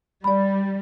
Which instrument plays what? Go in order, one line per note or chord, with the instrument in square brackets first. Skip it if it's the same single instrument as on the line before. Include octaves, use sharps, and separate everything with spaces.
[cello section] G3 [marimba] D5 B5